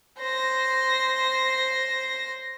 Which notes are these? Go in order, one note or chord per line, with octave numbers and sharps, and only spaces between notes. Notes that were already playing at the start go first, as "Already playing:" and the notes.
C5 A#6